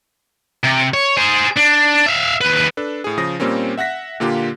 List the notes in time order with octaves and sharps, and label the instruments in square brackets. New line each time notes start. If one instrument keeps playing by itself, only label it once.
[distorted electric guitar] C3
C#5
G#4 C5
D4
E5 F5
D#2 B4
[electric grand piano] D4 A4 B4
A2 G#4
C#3 F3 D#6 A#6
A#2 G3 A#3 C4 C#4
E5 F#5 F#6 A#6 B6
A#2 D3 A#3 F4 G4